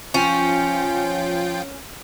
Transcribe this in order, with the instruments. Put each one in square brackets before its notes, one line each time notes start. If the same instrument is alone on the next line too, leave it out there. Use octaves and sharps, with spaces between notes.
[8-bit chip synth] F3 F4 G5 [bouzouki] C#4